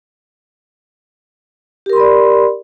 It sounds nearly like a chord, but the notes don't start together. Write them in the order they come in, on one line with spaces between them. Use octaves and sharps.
G4 A#4 C6 B5 D5